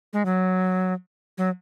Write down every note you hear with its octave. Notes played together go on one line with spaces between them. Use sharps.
G#3
F#3
F#3